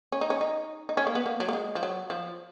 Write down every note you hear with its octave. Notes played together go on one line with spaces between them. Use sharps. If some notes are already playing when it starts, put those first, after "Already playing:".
C#4
D#4
C#4
D#4
D#4
C#4
A#3
B3
A#3
F#3
A#3
G#3
F3
F#3
F3